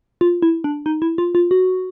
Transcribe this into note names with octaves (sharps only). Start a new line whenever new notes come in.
F4
E4
D4
D#4
E4
F4
F4
F#4